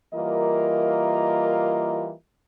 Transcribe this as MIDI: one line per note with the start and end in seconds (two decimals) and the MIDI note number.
0.14 2.12 52
0.14 2.12 55
0.14 2.12 58
0.14 2.12 65
0.14 2.12 70
0.14 2.12 75